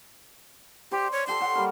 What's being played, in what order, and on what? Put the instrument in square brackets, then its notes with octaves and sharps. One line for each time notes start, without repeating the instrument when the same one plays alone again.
[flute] G4 [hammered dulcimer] C5 D5
[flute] C#5
[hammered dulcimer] F4 G4 A4 [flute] C6
[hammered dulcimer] C#5 F#5
G3 A#3 A#4